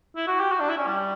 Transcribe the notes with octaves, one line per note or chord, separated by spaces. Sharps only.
E4
F#4
G4
F#4
D4
E4
C#4
G3